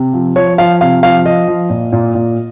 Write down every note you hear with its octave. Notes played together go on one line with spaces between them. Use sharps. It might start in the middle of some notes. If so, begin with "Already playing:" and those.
Already playing: C3
F3
F3 C#5
F3 F5
C3 F5
F3 F5
F3 D#5
F3
A#2
A#2
A#2